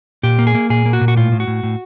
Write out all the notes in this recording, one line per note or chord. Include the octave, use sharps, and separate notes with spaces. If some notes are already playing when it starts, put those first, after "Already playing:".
A#2 G4
A#3
G#4
A#3
A#2 G#4
A#3
F#4
A#2
F#4
A2 F4
A2
F#4
A2
A2